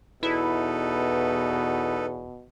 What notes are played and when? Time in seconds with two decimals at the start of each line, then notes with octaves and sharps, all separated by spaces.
0.23 E2 B2 D#4 E4 A4 B4